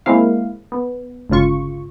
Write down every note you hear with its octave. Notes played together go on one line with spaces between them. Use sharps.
G#3 A#3 C4 E4 F5
B3
G1 C#2 C#3 F4 C#6